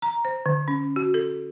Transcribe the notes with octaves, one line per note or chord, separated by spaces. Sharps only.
A#5
C5
D3
C#4
F#4
A4